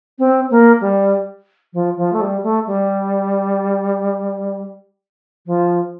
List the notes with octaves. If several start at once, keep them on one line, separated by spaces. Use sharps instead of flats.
C4
A#3
G3
F3
F3
A3
G3
A3
G3
F3